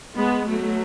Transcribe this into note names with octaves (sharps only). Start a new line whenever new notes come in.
G#3 B3
F#3 A3